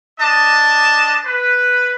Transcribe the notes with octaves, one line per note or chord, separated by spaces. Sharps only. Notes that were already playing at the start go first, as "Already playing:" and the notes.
D4 D#5 A5
B4